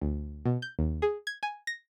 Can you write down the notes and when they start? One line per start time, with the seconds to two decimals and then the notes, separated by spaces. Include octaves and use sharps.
0.02 D2
0.46 B2
0.62 G6
0.79 D#2
1.02 G#4
1.27 G#6
1.43 G#5
1.67 A#6